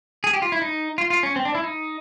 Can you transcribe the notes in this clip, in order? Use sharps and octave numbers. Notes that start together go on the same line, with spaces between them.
G#4
G4
F4
E4
D#4
F4
F4
C#4
C4
D4
E4
D#4